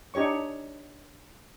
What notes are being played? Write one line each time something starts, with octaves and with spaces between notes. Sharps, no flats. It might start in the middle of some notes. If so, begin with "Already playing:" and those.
D4 D#4 G4 C#5 C#6